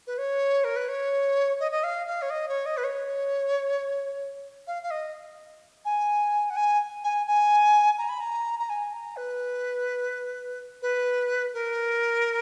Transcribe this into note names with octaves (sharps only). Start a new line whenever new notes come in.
B4
C#5
A#4
B4
C#5
D#5
D#5
F5
F5
C#5
D#5
C#5
D#5
B4
C#5
F5
F5
D#5
G#5
F#5
G#5
G#5
G#5
A#5
B5
A#5
A#5
G#5
A#5
B4
B4
A#4